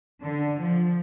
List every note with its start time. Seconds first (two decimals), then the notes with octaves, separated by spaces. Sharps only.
0.23 D3
0.60 F3